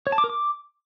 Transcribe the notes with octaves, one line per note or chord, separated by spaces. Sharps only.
C#5
A5
D6
A#4
D6